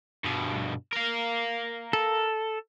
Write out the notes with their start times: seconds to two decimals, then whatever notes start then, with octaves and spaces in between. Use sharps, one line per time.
0.24 G2 B2
0.93 A#4 F5
1.93 A4